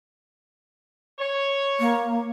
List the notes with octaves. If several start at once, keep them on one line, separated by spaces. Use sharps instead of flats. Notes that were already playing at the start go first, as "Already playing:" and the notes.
C#5
A#3